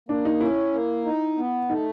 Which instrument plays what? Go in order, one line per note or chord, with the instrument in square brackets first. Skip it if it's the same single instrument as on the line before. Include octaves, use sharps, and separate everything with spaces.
[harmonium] A#3 [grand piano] D4
[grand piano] D#4
[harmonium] C#4 [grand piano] E4
[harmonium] A#3
D#4
B3
[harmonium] A3 [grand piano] D#4